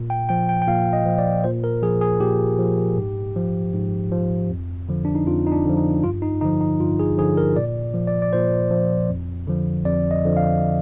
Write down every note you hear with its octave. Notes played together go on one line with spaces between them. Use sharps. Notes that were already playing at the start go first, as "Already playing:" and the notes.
Already playing: A#2
G5
F3 G5
G5
G5
A#2 F5
D#5
F3
D5
A#2 C5
A#4
F3 G#4
G#4
A#2 G4
F3
G#2
F3
G#2
F3
F2
D3 F3
D4
D#4
F2 F4
D#4
D4
D3 F3
D#4
G2 F4
D#4
D3 F3 D#4
D#4
G2 F4
G#4
D3 F3 G#4
A#4
A#2 D5
F3
D5
D5
A#2 C5
F3
F2
D3 F3
F2 D5
D#5
D3 F3
F5